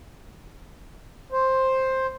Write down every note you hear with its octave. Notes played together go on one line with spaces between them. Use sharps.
C5